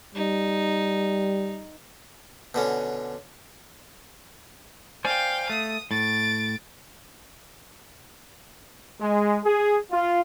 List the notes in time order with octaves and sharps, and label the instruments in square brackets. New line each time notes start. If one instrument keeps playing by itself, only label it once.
[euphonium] G3 [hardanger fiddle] D#4
[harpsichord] B2 D3 C#4
[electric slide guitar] C5 D5 G#5 [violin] F5 G5
[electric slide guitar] A3 [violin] D#6
[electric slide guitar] A2 [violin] A6 D7
[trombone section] G#3
G#4
F4